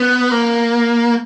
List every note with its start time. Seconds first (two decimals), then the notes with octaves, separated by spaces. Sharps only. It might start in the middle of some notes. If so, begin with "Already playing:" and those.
Already playing: B3
0.31 A#3